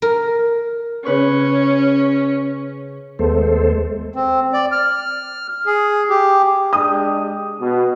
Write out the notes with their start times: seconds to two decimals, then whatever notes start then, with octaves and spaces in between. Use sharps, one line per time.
0.02 A#4
1.05 C#3 C#4 B4 C#6
3.19 D#2 G#3 A3 B3 A4 C5
4.15 C4
4.53 D5
4.72 F6
5.66 G#4
6.09 G4
6.73 G#3 D4 G4 D#6
7.60 B2